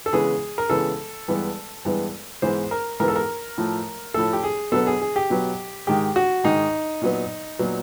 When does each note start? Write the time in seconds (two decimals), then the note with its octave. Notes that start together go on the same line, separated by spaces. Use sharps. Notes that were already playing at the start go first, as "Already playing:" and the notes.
0.06 A4
0.13 C#3 E3 G#3 B3 G#4
0.58 A#4
0.70 C#3 E3 G#3 B3 A4
1.28 G2 E3 G#3 B3
1.85 G2 E3 G#3 B3
2.42 G#2 E3 G#3 B3 C5
2.71 A#4
3.00 G#2 E3 G#3 B3 A#4
3.08 A4
3.16 A#4
3.58 A2 F3 A3
4.14 A2 F3 A3 A4
4.33 G4
4.43 G#4
4.72 B2 F#3 B3 A4
4.87 G#4
5.01 G#4
5.16 G4
5.30 B2 F#3 B3
5.87 G#2 D#3 G#3 G4
6.16 F#4
6.44 G#2 D#3 G#3 D#4
7.02 A#2 F#3 B3
7.59 A#2 F#3 B3